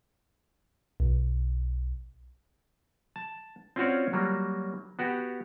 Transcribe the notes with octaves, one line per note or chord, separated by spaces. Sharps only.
B1
A5
C4 C#4 F4 F#4 C#5 D5
F#3 G3 A#3
B3 F#4 G4